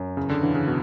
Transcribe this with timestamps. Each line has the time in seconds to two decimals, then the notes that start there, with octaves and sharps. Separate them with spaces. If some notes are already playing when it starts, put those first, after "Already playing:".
Already playing: F#2
0.17 E2 C#3
0.29 D3
0.43 D3 E3
0.55 C#3
0.67 B2